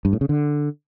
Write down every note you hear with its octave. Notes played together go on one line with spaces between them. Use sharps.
G2
A2
C#3
D3